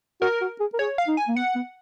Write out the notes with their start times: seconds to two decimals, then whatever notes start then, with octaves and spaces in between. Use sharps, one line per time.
0.22 F#4 A#4
0.41 F#4
0.60 G#4
0.74 A#4
0.79 G#4 C#5
0.98 F5
1.08 D#4
1.17 G#5
1.28 A#3
1.36 B3 F#5
1.56 B3